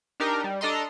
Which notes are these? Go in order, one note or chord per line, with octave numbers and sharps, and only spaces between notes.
D4 D#4 G4 A#4
G3
D4 A4 D#5 A#5 C6